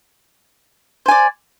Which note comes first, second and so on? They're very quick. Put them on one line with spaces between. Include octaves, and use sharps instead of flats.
C5 G#5 D5